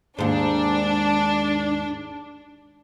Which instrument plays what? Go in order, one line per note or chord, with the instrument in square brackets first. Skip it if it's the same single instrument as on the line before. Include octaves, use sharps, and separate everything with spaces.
[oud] D#2 G#2 [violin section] D4